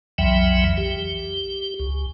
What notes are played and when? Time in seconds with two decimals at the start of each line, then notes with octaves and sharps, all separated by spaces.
0.18 B1 F2 E3 F#3 E5 G5
0.77 G4
1.80 C#2